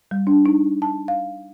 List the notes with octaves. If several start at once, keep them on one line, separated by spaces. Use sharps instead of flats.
G3
D4
D#4
A5
F5